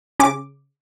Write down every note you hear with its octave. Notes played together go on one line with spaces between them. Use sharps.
C#3 D6